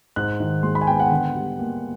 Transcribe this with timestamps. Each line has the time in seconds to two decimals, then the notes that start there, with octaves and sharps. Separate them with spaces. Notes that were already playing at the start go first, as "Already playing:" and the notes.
0.16 G#2 F#6
0.40 D#3
0.63 G#3 C6
0.75 B5
0.81 G#5
0.87 B3 G5
1.00 F#5
1.11 D3
1.35 G3
1.59 A#3